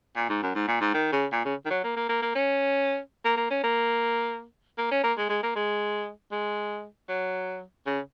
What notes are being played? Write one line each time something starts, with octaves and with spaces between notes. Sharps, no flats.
A#2
G#2
F#2
G#2
A#2
G#2
D#3
C#3
A#2
C#3
D#3
F#3
A#3
A#3
A#3
A#3
C#4
A#3
A#3
C#4
A#3
A#3
C#4
A#3
G#3
G#3
A#3
G#3
G#3
F#3
C#3